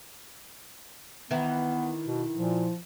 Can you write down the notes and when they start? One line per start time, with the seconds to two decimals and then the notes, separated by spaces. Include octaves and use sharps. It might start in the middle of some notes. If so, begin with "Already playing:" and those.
1.31 D#3 E3 B3 E4
2.07 B2
2.34 A#2 F3